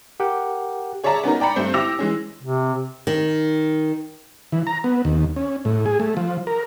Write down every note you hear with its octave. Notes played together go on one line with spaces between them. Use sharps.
G4 A#4 F#5 G5
G#4 C#5 D5 E5 A5 A#5
B3 C#4 D#4 A#4
D5 G5 A#5 B5 C#7
G2 A3 C4 C5 C#7
E4 G4 D6 E6 A#6 F7
E3 G#3 C#4
C3
D#3
E3
A#5
B3
D#2
C#4
A2
G#4
A3
F3
A#4